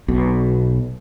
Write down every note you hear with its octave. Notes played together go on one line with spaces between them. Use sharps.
B1 B2